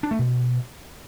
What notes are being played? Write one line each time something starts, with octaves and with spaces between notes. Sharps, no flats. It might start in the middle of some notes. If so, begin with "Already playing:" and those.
D4
A3
B2